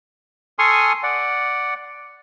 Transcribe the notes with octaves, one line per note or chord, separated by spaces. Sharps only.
A4 G#5 C6 C#6 D#6 F6
D5 F#5